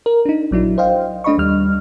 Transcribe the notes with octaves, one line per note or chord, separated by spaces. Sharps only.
A#4
D4 D#4
A#1 F#3 D4 E4
C5 D#5 F5 G5
A3 D4 D#5 B5 C#6
D#2 G3 F6